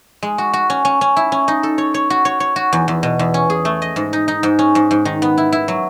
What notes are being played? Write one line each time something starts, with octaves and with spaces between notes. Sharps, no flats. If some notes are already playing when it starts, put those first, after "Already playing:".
G#3
F#4
F#4
C#4
C#4
C#4
E4
C#4
D#4
A4
C#5
C#5
F#4
C#5
C#5
F#4
E2
E2
B2
E2
C#4
G#4
A3
D#5
G#2
D#4
D#4
G#2
C#4
G#2
G#2
D#3
B3
E4
E4
F#3